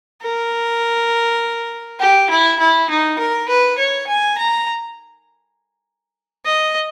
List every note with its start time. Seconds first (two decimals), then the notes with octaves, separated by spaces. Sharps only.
0.22 A#4
2.00 G4
2.30 E4
2.60 E4
2.90 D#4
3.19 A#4
3.49 B4
3.78 C#5
4.08 G#5
4.38 A#5
6.45 D#5